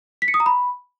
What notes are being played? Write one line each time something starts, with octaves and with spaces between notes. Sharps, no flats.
B6
C#7
D#6
A#5
B5